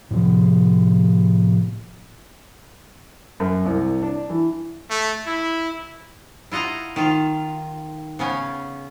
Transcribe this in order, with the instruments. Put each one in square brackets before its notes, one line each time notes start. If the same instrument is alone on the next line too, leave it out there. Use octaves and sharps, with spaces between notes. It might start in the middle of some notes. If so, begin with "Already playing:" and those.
[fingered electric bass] A2 C3 F3
[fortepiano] F#2
C2
D4
E3
[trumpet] A3
E4
[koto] E4 F4 D#5 F#5 A#5
D#3 F4
C#3 B3 C#4